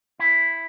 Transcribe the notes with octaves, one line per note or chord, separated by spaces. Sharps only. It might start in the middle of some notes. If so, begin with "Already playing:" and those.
E4